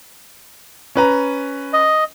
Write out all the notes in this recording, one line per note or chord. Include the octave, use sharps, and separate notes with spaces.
C#4 B4 A#5
D#5